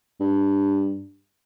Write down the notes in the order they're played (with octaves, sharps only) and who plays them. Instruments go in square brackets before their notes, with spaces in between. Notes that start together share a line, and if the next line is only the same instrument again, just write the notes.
[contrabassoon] G2